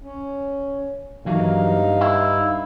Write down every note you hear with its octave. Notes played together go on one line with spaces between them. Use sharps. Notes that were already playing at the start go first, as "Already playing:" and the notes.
C#4
G2 E3 F#3 A#3 D#4 F5
E4